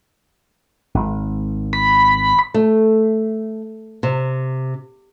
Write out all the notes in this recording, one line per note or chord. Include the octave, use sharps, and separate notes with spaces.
G#1
B5
A3
C3